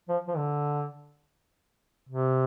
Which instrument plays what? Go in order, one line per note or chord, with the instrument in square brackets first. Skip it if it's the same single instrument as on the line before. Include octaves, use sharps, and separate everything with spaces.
[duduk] F3
F3
D3
C3